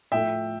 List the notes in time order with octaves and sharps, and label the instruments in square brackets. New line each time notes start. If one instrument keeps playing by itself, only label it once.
[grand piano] A2 F3 A3 E5 G5